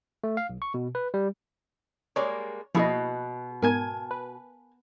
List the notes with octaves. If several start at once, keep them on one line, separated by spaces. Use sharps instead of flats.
A3
F5
B1
C#6
B2
B4
G3
G3 G#3 A#3 C#5 D5
B2 F3 A#3 E4 F#4 G#4 D#5
G#2 B3 A#4 G#5 A5 G#6
B4